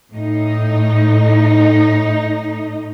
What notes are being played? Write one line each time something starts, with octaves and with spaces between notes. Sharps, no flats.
A2 D#4